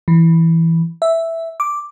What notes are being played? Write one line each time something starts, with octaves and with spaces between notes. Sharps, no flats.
E3
E5
D6